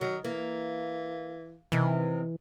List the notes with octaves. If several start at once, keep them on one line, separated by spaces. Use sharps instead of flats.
D#3 F#3
E3 A#3
C3 D#3 E3